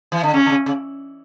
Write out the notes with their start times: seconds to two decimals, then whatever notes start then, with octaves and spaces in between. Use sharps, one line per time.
0.12 E3
0.23 D3
0.34 C#3 C#4
0.46 D3
0.50 C#3
0.66 C#3